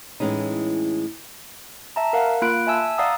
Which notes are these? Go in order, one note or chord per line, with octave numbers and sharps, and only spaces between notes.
A2 E3 G#3 C#4 D#4
E5 A5 A#5
A#4 F5 F#5
A#3 F4 B5 F#6 D7
E5 G#5 A5 E6
D5 F5 F#5 A#5 D#6 E6